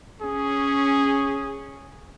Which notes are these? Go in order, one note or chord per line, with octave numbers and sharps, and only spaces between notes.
C#4 G#4